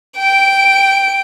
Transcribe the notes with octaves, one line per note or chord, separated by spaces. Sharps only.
G5 D7